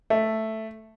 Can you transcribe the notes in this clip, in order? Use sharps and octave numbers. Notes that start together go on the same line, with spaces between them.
A3